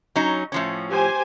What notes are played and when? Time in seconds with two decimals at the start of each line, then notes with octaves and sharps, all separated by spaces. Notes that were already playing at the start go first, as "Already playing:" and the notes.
0.16 F#3 C#4 D#4
0.52 A2 F3 C#4
0.89 G4 C5 G#5